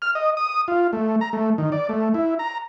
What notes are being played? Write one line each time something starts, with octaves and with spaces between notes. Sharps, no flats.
F6
D#5
D#6
F4
A3
A#5
A3
D#3
D5
A3
E4
A#5